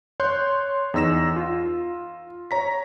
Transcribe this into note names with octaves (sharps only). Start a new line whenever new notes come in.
C#5 C6 F#6 G6
E2 D#4 E6 A#6 E7
F4
C#5 A#5 B6